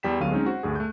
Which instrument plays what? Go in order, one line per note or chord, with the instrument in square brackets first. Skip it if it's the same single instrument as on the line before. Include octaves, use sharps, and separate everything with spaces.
[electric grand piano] E2 G3 G5 B6 E7
D2 D3 F#3 B3 F5 D#7
G#3 C4 C#4 D#4
F#4 C5
D2 G2 G#4
A3 F#6 G6